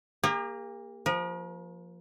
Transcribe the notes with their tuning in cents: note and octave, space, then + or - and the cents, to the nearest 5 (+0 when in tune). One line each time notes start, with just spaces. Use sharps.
A#3 +0 G4 +45
F3 +0 A#4 +40